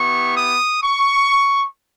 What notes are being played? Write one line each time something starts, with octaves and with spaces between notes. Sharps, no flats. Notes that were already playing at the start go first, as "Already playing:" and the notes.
Already playing: B3 E4 G4 C#6
D#6
C#6